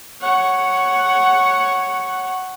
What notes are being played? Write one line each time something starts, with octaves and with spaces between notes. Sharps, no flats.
C#5 F#5